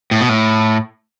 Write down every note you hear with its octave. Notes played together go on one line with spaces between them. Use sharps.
A2
B2
A2